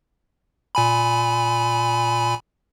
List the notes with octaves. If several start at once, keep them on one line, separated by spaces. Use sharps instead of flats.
A#2 G#5 B5